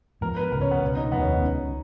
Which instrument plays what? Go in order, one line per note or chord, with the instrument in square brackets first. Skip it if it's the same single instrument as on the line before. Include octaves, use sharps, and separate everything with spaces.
[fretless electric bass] G#2 F3 B3 [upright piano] A#4
[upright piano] B4
[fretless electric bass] C#2 C#3 F3 [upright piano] A#4
[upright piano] C#4
B3
[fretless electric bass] C#2 B2 A#3
[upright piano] D#4
[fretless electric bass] F1 D#2 D#3 A#3 [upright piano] B3
[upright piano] C#4
D#4
[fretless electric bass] C#2 C#3 F#3